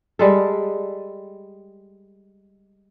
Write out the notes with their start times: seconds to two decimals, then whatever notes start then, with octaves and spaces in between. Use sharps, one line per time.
0.19 G3 G#3 A4